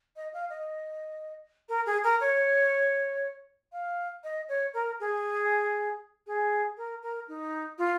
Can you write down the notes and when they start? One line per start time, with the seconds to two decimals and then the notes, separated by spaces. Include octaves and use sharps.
0.16 D#5
0.33 F5
0.50 D#5
1.69 A#4
1.86 G#4
2.03 A#4
2.20 C#5
3.72 F5
4.24 D#5
4.48 C#5
4.73 A#4
5.00 G#4
6.27 G#4
6.77 A#4
7.02 A#4
7.28 D#4
7.78 F4